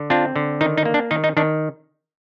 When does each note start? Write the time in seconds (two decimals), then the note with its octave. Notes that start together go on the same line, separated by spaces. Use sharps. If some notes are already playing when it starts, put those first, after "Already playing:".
Already playing: D3
0.10 C4 D4 F4
0.36 D3
0.61 D#3 D#4
0.77 D#4
0.85 A#3
0.94 D4
1.11 D#3 D#4
1.24 D#4
1.37 D#3 D4